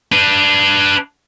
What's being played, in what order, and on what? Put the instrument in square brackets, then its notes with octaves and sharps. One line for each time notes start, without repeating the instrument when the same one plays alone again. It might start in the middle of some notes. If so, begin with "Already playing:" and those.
[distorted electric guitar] D4 B4